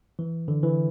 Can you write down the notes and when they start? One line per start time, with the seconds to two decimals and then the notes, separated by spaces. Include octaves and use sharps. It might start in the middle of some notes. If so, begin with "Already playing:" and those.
0.19 E3
0.48 D3
0.63 E3